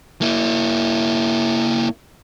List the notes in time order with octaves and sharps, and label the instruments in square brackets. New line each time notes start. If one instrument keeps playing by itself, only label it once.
[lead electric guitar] A#3 E4